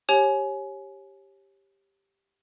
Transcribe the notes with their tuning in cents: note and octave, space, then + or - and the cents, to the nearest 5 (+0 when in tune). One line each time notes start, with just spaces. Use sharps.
G4 +0 C#5 -25 G#5 +25